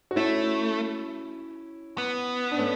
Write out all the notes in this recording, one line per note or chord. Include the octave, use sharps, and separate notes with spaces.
F#4
A3 C#4 E4
B3
D4
A3 C#4